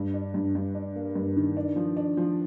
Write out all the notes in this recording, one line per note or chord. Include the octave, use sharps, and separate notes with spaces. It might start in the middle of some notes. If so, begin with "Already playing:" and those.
Already playing: G2
D4
G2
G2
D4
A#3
G2
D#3
D4
F3
D4
F3